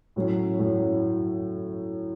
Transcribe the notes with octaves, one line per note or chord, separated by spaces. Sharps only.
A2 F#3 C#4
A2 F#3 C#4